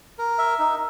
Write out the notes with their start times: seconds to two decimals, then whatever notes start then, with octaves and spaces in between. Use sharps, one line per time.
0.19 A#4
0.38 E5
0.59 D#4